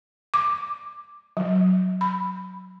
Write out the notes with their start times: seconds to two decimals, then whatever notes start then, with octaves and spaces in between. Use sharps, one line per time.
0.34 D6
1.37 F#3
2.01 B5